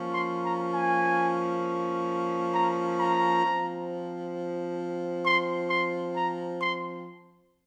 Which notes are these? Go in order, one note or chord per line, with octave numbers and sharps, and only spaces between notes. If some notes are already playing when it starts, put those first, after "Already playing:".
Already playing: F3 A#3 C#4
C6
A#5
G#5
A#5
A#5
F3 C4
C6
C6
A#5
C6